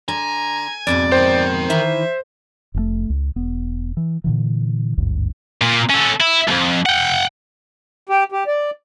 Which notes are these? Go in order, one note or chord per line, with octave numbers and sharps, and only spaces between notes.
D3 G#5 A#5
F2 G#2 B2 D5
A#4 C5 G5
D#3 E3 E4 E5
F1 G#2 A3
C#2
E1 B3
E3
A#2 D3 E3
G#1 D2 G2
A#2
C#4 A4
E4
C2 F2
F#5 G5
G4
G4
D5